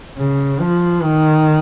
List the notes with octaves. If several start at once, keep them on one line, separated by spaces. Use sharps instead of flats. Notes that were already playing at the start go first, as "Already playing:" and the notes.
C#3
F3
D#3